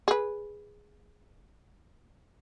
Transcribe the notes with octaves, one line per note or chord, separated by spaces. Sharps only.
G#4 B4